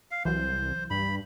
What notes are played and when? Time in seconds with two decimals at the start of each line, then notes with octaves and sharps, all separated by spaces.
0.11 F5
0.25 C2 E3 F#3 C5
0.90 G2 B5